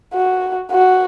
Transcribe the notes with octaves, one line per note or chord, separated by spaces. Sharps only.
F#4
F#4